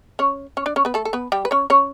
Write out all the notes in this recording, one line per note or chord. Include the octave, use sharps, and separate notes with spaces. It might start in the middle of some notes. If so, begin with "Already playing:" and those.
C#4 C#5
C#4 C#5
D4 D5
C#4 C#5
B3 B4
A3 A4
A4
B3 B4
G3 G4
B4
C#4 C#5
C#4 C#5